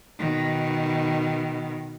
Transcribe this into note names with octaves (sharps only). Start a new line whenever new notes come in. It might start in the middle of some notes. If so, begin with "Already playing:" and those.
B2 D#3